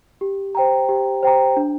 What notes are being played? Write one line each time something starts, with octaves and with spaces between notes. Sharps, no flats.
G4
C5 G5 A#5
G4
C5 G5 A#5
D4